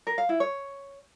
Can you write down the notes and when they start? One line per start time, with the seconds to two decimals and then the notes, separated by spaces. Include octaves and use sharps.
0.07 A#4
0.18 F5
0.29 E4
0.40 C#5